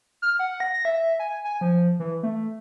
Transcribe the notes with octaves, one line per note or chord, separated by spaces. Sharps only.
F6
F#5
A#6
E5
G#5
G#5
F3
E3
A3